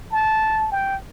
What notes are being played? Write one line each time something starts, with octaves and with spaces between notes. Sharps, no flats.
A5
G5